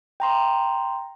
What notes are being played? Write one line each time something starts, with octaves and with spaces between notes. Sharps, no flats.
G5 A#5 C6